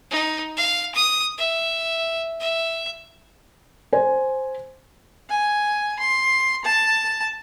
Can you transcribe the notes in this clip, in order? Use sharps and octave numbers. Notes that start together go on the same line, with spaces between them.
D#4
F5
D#6
E5
E5
C5 G#5
G#5
C6
A5